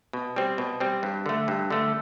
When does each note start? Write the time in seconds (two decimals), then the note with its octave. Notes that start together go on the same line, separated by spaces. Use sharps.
0.13 B2
0.36 G3 C4
0.58 B2
0.80 G3 C4
1.03 G2
1.26 D3 A3
1.48 G2
1.70 D3 A3